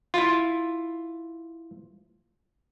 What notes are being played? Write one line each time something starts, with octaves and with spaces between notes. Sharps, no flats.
E4 F4